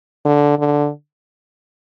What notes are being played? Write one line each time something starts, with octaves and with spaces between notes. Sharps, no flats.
D3
D3